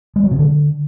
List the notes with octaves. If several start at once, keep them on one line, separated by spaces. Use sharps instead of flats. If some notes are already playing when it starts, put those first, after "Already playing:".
G#3
F#3
C3
D3